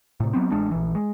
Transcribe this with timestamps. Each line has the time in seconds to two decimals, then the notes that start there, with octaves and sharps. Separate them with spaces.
0.20 A2 C3
0.33 F#3 G3 B3 C4
0.51 A1 G#3 D4
0.71 A#1 E3
0.95 G#3